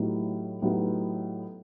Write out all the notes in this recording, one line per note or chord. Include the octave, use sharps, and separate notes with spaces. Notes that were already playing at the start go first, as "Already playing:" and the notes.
Already playing: A2 F#3 B3 D#4 G4
A2 F#3 B3 D#4 G4